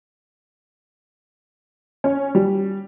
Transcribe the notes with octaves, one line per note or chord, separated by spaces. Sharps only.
C#4
G3